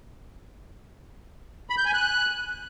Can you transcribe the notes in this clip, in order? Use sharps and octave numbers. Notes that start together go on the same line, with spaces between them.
B5
G6
G#5
F#6